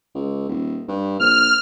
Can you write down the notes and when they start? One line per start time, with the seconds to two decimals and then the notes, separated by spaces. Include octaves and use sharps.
0.15 C#2
0.49 D#1
0.88 G2
1.20 A#1 F6